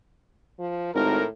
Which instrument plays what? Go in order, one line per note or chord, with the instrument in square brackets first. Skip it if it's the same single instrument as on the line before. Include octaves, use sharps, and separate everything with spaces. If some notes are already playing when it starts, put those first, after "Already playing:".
[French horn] F3
[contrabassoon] G#1 [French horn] A2 [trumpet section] A#4